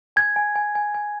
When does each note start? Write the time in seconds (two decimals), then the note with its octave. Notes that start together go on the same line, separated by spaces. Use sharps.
0.16 G#5 G#6
0.36 G#5
0.56 G#5
0.75 G#5
0.95 G#5